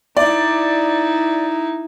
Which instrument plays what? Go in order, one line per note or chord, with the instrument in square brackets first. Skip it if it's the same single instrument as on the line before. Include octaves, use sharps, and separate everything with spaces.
[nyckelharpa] D#4 E4 [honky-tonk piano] D5